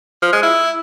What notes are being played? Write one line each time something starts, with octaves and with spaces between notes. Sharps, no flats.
F3
G#3
E4